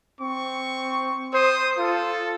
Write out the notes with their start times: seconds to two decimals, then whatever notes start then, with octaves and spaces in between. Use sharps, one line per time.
0.21 C4 C#6
1.34 C5 D#6
1.78 F4 A4